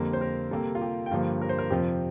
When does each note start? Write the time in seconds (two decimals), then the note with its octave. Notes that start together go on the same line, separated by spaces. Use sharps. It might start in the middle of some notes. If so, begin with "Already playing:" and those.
Already playing: F2 D3 G3 A#3
0.13 C5
0.21 A#4
0.51 C3 G3 A#3 A4
0.75 F4
0.81 G4
1.06 G5
1.11 G2 D3 F3 A#3 F5
1.42 A#4
1.49 C5
1.59 A#4
1.70 F2 C3 F3 G4